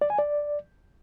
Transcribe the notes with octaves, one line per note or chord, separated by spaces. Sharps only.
D5
G#5
D5